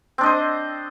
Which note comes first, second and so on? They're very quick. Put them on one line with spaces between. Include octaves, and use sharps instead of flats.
C4 D4 D#5 C5